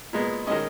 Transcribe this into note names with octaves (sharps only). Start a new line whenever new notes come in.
A#2 G#3 B3
D#3 G#3 C#4 D#5